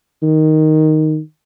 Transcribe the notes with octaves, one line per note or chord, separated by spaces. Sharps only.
D#3